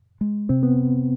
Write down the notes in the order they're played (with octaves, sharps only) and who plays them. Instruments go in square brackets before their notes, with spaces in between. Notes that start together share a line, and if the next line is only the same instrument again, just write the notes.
[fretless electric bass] G#3
[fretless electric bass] C3 [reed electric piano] C4
[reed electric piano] B3